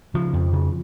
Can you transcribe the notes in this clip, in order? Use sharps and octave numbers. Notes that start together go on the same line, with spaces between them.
C#3 F3
F2
C#3